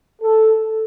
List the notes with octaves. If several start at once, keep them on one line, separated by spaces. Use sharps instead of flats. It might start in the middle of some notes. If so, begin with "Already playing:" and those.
A4